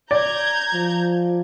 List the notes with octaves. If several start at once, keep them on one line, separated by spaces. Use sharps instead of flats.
D5 A#5 G6 G#6
F3